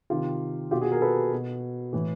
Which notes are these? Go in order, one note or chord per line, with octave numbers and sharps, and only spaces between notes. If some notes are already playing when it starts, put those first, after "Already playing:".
C3 D#3 F4 G4
B2 F4 G4
F#4 G#4
G#4 A#4
A4 B4
B2
A2 E3